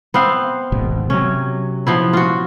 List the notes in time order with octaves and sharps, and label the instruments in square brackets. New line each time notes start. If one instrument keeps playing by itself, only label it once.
[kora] B3 C4 F5
[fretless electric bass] D1 G#1 B2
[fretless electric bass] C3 F#3 [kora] C#4
[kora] F3 B3 E4
F4 F#4